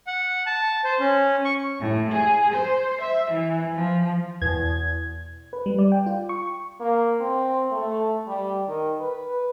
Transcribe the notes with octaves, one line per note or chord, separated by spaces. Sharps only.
F#5
A5
C5
C#4
C#6
A2
G#4
C5
E5
E3
F3
E2 B2 G#6
B4
G3
D5
G5
F4
C#6
A#3
C4
A3
G3
D#3
B4